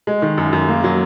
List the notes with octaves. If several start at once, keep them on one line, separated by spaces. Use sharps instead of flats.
G#3
D#3
F#2
F#2
A#3
F#3